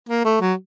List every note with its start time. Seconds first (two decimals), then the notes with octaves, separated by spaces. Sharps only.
0.09 A#3
0.25 A3
0.41 F#3